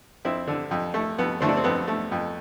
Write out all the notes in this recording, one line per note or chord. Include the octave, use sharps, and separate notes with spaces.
F2 C4 E4
D3
F2
A3
F2 B3
D3 A3 C4
D4
C4
F2 B3
A3
F2